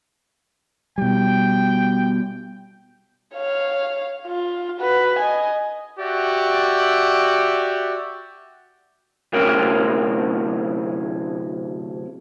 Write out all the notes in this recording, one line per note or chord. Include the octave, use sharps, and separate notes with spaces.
B2 G3 G5
C#5 F5
F4
F#4 B4
D#5 G#5
F#4 G4 D5 E5
D2 A2 C3 C#4 A#4 G5